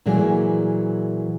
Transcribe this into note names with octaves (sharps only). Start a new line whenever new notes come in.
A#2 E3 F#3 A#3 G#4